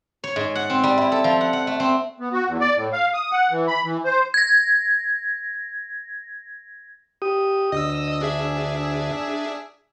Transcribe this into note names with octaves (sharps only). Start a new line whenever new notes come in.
C#5
G#2
F#5
C4
G3
E4
A4
F3
F#5
F#5
A3
C4
B3
F#4
E2
D5
A2
F5
D#6
F#5
E3
B5
E3
C5
G#6 A#6
G4 D#6
D2 D#5 D#6 E6
D4 G#4 E5